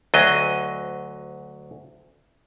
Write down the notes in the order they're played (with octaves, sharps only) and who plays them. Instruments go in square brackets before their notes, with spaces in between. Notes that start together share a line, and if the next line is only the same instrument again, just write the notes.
[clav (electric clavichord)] D2 F#3 D#5